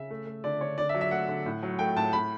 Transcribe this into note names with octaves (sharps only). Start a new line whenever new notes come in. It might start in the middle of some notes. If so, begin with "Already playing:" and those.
Already playing: C#3 E5
A3
A3
D3 D5
D3 C#5
D3 D5
E5
F#3
E5
A3 F#5
D3
A2
F#3
A3 G5
A2 A5
A2 B5